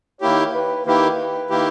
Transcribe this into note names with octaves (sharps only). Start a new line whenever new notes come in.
D#3 A#3 E4 G4 C#5
B4
D#3 A#3 E4 G4 B4
D#3 A#3 E4 G4